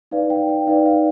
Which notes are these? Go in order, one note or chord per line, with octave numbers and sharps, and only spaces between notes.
D#4 B4 D5 F5
G5
G5
D#4 B4 D5 F5
F5